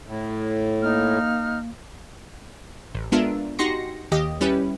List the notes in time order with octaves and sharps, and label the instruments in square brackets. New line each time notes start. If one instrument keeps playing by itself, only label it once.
[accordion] A2
[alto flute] A#3 [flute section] D#4 F6
[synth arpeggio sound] A1
G#3 B3 D4 F4 A#4 E5
D#4 F#4 G4 C6 A#6 C#7
D#2 G4 D#5
G3 C#4 E4 G4 B4